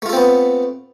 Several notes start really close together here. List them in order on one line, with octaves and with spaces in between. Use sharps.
A3 F4 A4 C4 B3